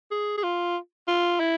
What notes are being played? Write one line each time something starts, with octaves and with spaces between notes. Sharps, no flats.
G#4
G#4
F4
F4
E4